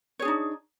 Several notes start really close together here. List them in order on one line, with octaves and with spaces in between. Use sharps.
C#5 G#4 D4 D#4